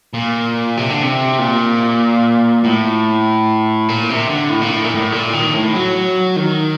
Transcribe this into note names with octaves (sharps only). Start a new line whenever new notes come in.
A#2
C3
D3
C3
A#2
A2
A#2
C3
D3
A2
A#2
A2
A#2
A2
A#2
D#3
A2
F#3
D#3